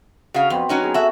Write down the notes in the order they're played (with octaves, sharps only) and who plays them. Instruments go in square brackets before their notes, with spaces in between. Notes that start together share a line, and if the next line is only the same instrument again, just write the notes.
[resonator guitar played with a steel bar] C#3 F5 [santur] F#4
[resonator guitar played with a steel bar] F2 [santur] B3 C4 B4
[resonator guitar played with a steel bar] F#3 C#4 D#4
[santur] B3 G#4 A#5
[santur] C#4 A4 C#5 [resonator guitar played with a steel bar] F#4 E5